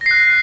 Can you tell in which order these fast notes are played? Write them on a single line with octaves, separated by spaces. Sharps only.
A#6 C7 F#6